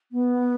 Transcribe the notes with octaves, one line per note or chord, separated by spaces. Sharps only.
B3